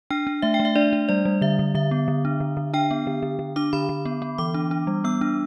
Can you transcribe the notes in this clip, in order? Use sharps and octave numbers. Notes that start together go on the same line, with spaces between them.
D4 G5
D4
A3 E5
G5
A3
E5
D4 D5
D4
G3 D5
G3
D3 E5
D3
D3 E5
B3
D3
D4
D3
D3
D4 G5
B3
D3
D3
D3
D4 D6
D3 B5
D3
B3
B3
E3 D6
D4
D4
G3
B3 E6
D4